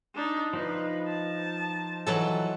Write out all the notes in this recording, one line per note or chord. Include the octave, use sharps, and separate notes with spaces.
D4 D#4
F3 D#4 B4
A5
E3 F#3 A4